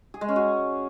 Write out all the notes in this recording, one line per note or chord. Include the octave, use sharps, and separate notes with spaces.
G#4
G#3
C#4
F#4